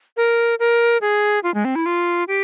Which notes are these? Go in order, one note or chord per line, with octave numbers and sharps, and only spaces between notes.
A#4
A#4
G#4
F4
G#3
C4
E4
F4
G4